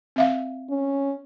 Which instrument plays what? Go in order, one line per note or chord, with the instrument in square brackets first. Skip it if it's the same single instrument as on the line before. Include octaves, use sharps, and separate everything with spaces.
[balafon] C4 E5 F5
[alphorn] C#4